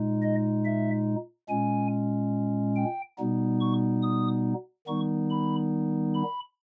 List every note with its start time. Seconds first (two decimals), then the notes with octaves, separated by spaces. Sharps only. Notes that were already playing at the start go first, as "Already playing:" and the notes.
Already playing: A#2 G#3 D#4
0.23 D#5
0.65 E5
1.49 A#2 G#3 C#4 G#5
2.76 G5
3.18 B2 G3 B3 D#4
3.60 C#6
4.03 D#6
4.87 D#3 G3 B3 D#4 C#6
5.30 B5
6.14 B5